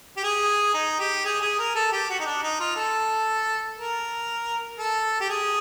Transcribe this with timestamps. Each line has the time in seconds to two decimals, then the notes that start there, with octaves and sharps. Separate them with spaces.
0.17 G4
0.24 G#4
0.74 D#4
0.99 G4
1.25 G#4
1.41 G#4
1.59 A#4
1.75 A4
1.92 G4
2.09 F#4
2.20 D#4
2.25 D4
2.42 D#4
2.60 F4
2.76 A4
3.77 A#4
4.78 A4
5.20 G4
5.29 G#4